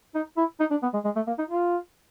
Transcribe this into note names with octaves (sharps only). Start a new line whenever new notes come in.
D#4
E4
D#4
D4
B3
G#3
G#3
A3
A#3
D#4
F4